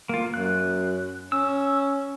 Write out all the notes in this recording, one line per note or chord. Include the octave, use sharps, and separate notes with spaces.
A#3 F4
F#2 F#6
C#4 E6